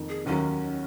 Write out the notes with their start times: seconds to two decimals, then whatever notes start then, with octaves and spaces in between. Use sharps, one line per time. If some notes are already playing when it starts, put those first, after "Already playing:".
Already playing: F2 D#3 A#3
0.09 G#4
0.26 D#2 D#3 F#3 C#4